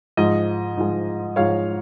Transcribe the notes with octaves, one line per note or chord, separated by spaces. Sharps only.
G#2 F3 G#3 D#5
G#2 F3 G#3
G#2 F3 G#3 C#5 F5